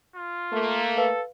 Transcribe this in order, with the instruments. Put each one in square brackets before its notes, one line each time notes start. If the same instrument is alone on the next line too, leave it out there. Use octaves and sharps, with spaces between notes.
[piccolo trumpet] F4
[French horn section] A3 A#3
[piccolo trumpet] A4 [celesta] B4 F5